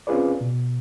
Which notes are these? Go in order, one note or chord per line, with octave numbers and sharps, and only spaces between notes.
C4 C#4 F4 G#4 B4 D5
B2